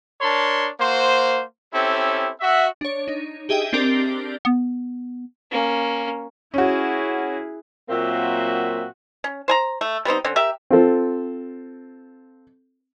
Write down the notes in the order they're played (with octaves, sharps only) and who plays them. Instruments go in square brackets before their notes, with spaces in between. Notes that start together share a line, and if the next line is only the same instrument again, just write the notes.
[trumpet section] D4 A#4 C#5 A5 C6
A#3 F#4 C5
C4 C#4 E4 G4 A4
F#4 E5
[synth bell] D4 C#5
D#4
G4 G#4 D#5 E5 G5
C4 D4 G4 A#4 D5
[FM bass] B3
[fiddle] A#3 C#4
[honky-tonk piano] C#4 F#4 [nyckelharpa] E4 G#4
[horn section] A#2 F#3 A#3 C4 F#4 E5
[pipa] C#4
C5 G#5 A#5
A3
G3 B3 C4 D#4
D3 C4 C#4
G4 A#4 E5
[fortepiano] C4 F4 A4